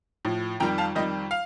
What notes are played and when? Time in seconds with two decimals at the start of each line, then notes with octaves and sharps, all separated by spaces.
0.25 A2 F3
0.60 F2 D#3 G3 G5 A#5
0.78 F5 A5
0.95 F2 D#3 G3 D#5
1.31 F5